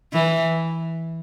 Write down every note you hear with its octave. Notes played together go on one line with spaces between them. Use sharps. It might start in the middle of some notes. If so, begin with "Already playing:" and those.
E3